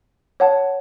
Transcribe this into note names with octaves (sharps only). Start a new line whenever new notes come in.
C#5 F#5 A5